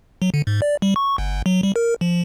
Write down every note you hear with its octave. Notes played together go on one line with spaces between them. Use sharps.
F#3
D3
G#2
D5
G3
C#6
G1
F#3
G3
A#4
F3